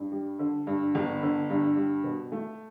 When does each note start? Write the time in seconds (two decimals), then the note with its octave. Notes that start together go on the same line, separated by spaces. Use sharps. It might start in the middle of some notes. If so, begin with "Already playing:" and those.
Already playing: G2
0.12 G3
0.39 D3
0.67 G2
0.95 G1
1.22 D3
1.50 G2
1.76 G3
2.04 B2
2.32 A3